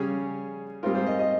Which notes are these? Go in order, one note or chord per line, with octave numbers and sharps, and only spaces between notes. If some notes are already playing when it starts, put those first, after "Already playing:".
Already playing: C#3 G3 C#4 G#4
G#2 G3 C4 F4 A#4
C5
D#5
D#5